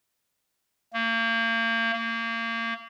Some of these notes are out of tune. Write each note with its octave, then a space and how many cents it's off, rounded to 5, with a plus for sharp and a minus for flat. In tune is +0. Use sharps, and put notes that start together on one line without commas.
A#3 -35
A#3 -30